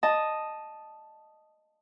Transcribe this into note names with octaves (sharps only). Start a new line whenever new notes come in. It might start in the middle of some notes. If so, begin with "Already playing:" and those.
D#5 A5